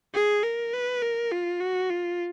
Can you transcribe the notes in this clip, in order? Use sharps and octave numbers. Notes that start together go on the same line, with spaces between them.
G#4
A#4
B4
A#4
F4
F#4
F4